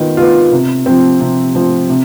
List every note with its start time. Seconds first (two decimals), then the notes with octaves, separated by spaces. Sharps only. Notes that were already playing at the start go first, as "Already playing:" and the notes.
Already playing: D#3 B3 F4
0.17 B3 F4
0.52 C3
0.86 F3 C4
1.20 C3
1.55 F3 C4
1.89 C3